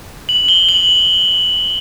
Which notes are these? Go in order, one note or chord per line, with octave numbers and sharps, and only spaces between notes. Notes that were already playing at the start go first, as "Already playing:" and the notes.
F#7
G7
F#7